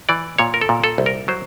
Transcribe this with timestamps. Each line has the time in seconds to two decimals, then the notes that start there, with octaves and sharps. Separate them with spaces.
0.09 E3 D5
0.38 A#2 C#5
0.54 A#4
0.61 A4
0.69 A#2
0.84 A4
0.98 C2
1.06 A#4
1.28 F#3 C5